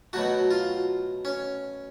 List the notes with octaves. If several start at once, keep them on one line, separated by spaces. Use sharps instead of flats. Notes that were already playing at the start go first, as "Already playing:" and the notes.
B2 F#3 A3 F#4
F4
C#4